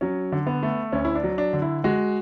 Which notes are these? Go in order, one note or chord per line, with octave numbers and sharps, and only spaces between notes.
F#3 C#4
D3
B3
A3
D2 C#4
E4
D4
F#3
D4
D3
E4
G#3 F#4